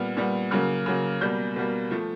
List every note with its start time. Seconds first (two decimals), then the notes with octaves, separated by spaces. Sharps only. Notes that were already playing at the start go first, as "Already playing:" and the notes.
Already playing: A#2 G3 B3 F6
0.16 A#2 G3 B3
0.51 C#3 F#3 A#3 F6
0.86 C#3 F#3 A#3
1.21 B2 G3 A#3 G6
1.56 B2 G3 A#3
1.91 F3 A3